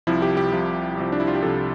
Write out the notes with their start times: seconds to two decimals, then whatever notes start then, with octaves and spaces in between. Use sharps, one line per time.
0.07 C2 C3 F3 E4
0.22 G4
0.37 G4
0.52 C2 C3 F3
0.97 C2 C3 F3
1.12 D4
1.20 E4
1.27 F4
1.35 G4
1.42 C2 C3 F3 A4